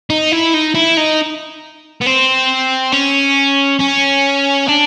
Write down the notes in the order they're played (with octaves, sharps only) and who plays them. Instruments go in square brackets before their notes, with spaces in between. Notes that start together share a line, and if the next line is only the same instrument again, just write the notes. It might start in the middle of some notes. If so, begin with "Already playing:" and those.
[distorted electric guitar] D#4
E4
D#4
E4
D#4
B3
C4
C#4
C#4
D4